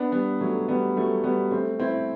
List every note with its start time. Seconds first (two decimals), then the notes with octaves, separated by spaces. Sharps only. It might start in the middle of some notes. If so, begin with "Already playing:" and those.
Already playing: B3 D4
0.12 G3 B3
0.41 F#3 A3
0.68 G3 B3
0.97 F#3 A3
1.24 G3 B3
1.51 A3 C4
1.80 C4 E4